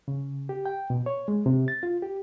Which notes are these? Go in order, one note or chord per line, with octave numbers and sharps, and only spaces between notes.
C#3
G4
G5
B2
C#5
G#3
C3
A6
F4
G4